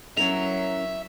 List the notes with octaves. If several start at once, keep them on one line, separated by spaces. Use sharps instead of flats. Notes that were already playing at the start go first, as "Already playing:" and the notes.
F#3 C#4 E4 A#4 E5 F7